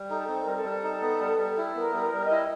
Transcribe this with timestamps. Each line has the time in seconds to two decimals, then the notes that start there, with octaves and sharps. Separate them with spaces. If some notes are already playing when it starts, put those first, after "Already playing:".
Already playing: G3
0.09 D#4 A4
0.28 C4 A4
0.42 G3 A#4
0.55 A4
0.64 G3
0.83 D#4
1.02 B3
1.21 G3
1.38 G3
1.57 E4
1.75 B3 A#4
1.93 G3
2.00 A#4
2.13 G3
2.24 D#5
2.31 E4